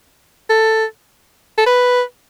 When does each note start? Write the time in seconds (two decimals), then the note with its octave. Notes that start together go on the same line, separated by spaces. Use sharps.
0.50 A4
1.58 A4
1.66 B4